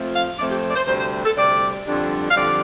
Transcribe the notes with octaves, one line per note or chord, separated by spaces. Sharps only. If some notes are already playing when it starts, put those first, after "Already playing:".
Already playing: F2 F3 A3 C4
F5
F2 F3 A3 C4 D5
G4
D5
C5
D2 C3 G3 C5
C5
A4
D2 C3 G3 D5
F2 D3 G3 D4
F5
F2 D3 G3 D4 D5